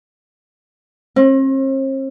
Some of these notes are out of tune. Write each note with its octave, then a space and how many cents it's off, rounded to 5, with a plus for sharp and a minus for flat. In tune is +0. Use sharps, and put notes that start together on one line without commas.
C4 +45